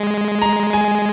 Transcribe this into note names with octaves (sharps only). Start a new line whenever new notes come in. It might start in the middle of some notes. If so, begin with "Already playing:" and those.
Already playing: G#3
A#5
G#5